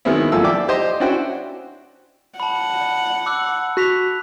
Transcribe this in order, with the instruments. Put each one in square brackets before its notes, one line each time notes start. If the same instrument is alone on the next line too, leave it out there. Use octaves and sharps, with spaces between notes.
[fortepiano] D#3 F#3 G#3 B3 C4 E4
A1 F#2 F3 A#3 A4 E6
D5 E5 G5 D6
G4 C5 D#5
C#4 D4 E4 F#4 C5 G5
[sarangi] F#5 [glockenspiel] A5 B5
[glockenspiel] D6 E6 F#6
[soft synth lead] F#4 [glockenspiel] F#6 B6 F7